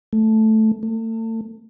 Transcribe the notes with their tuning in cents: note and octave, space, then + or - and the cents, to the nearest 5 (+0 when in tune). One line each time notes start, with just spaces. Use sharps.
A3 -5
A3 +35